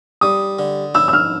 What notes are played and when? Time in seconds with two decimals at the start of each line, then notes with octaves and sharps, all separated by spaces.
0.21 G3 D#6
0.59 D3
0.95 E4 E6
1.08 E6
1.13 F6